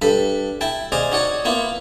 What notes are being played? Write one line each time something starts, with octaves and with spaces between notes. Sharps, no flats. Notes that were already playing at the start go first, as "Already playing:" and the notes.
G2 A4 B5
E4 G5 A5
G#4 C5 D5 D#5 F5
D#4 F#4 C#5 D5
A#3 B3 E4 F4